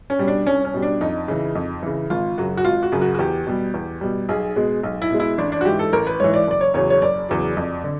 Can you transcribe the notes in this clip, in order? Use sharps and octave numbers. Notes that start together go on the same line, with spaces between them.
C#4
B2 G3
D4
C2 C#4
C#4
B2 G3
D4
F2 D#4
C#3 E3
F2
C#3 E3
G#1 F4
F#2 C#3 F#3 F#4
F#4
G#1 F4
F#4
F#2 C#3 F#3
F#4
F#4
E2 G4
B2 G3
E2
B2 G3
B1 G#4
B2 G#3
B1
E4
B2 G#3
E4
A1 D4
D4
F#4
G#2 E3 G4
A4
A1 A#4
B4
G#2 E3 C#5
D5
F#1 D5
C#5
E2 C#3 F#3 C#5
C#5
F#1 D5
E2 C#3 F#3
F2
D3